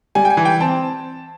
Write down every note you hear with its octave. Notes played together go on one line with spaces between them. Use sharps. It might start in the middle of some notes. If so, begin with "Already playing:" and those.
G3 G#5
G5
G#5
E3
G5
C4 A5